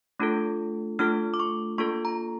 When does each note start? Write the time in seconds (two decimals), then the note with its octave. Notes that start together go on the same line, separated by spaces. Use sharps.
0.19 A3 D4 F4 A4
0.99 A3 D4 F4 A4 F6
1.34 D6
1.40 C#6
1.78 A#3 D4 F4 A4 C#6
2.05 A#5